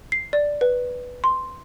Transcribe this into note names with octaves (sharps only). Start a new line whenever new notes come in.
C7
D5
B4
C6